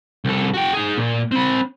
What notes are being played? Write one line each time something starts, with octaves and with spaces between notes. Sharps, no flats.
C2 A4
F#4 G5
D#4 G#4
A#2
C4 B5